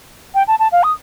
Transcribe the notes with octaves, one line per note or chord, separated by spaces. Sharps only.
G5
A5
A5
F5
D#6